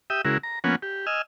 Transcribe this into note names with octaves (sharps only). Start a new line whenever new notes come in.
G4 E5 G5 D#6
C#3 G#3 E4 F#4 A#4
A#5
F3 A#3 B3 C#4 F#5 G#5
G4
D#5 G#5 E6 F6